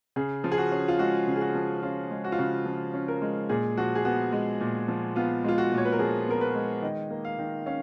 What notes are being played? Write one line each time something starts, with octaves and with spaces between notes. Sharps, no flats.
C#3 G#4
F3
G#4
F#4
C#4
F4
G#3 F#4
C#3
G#4
F#4
F3
C#4 F4
G#3
F#4
F4
C#3 F#4
F3
C#4
A#4
G#3
A#2 G#4
F3 F#4
G#4
B3 F#4
G#3
A#2
F3
B3 F4
G#3 F4
F#4
A#2
C#5
B4
A#4
F3 G#4
B3 A#4
B4
G#3
D#3 D#5
A#3
F5
D#3
C#4 F5